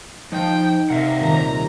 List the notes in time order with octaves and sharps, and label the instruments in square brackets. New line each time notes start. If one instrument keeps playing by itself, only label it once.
[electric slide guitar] F3 [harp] D#4 [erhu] G5
[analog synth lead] C3 [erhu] A#4 [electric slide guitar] D#5 E5 F#5
[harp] D#1 [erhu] A#5